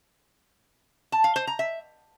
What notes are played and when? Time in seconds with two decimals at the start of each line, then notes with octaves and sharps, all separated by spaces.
1.12 A5
1.24 F5
1.36 C5
1.47 A#5
1.59 E5